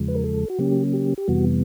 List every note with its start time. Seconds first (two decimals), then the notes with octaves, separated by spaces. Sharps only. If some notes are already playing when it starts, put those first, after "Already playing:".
Already playing: E2 C#3 F3 G#3
0.08 B4
0.15 A#4
0.24 A4
0.50 F#4
0.59 C#3 F#3 A#3 C#4 G4
0.93 G4
1.18 G4
1.28 F2 C3 E3 G3 B3 F#4